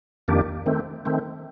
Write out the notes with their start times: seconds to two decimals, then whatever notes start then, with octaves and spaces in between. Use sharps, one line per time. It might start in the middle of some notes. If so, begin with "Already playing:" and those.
0.28 F2 D#3 A#3 D4 G4
0.66 D#3 A3 C4
1.05 D#3 A3 C4